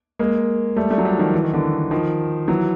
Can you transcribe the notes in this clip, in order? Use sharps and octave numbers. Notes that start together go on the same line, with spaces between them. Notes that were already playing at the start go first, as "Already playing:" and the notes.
G#3 A#3
G3 A3
G3 A3
F#3
F3 G3
D#3 F3
E3
D#3
D3 E3
D#3 F3
E3 F#3